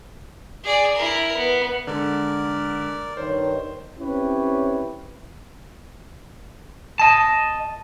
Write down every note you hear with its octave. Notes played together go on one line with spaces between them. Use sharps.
G#4 D5
E4 A#4
B3
D3 G#3 A#4 D5
G2 D#3 C5 C#5
C4 C#4 E4 G4 B4 C#5
D#5 A5